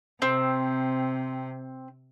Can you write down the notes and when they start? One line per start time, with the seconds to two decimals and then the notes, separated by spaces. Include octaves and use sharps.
0.22 C3 C4